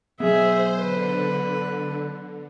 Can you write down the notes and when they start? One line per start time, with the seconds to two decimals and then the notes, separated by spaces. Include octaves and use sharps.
0.20 F#3 B3 G#4 C5 E5
0.80 D3 B4